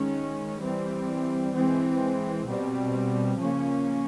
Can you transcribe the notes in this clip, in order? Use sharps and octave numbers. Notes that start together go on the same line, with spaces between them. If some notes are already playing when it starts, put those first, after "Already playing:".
Already playing: D#3 G#3 C#4
E3 G3 C4
E3 G#3 C4
B2 G3 C4
C#3 F3 A#3 C#4